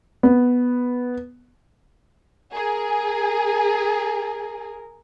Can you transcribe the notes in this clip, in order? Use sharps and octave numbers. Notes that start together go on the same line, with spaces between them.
B3
G#4 A#4